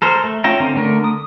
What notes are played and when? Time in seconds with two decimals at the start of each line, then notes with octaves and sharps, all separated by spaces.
0.02 A4 A#4 C5
0.24 A3
0.44 C#4 F4 E5 G5 A#5
0.60 D3 C4 C#4
0.75 D3 A3 A#4
1.04 D#6